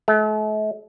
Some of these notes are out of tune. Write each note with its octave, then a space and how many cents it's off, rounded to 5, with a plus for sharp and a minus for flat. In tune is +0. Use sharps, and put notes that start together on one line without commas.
A3 -45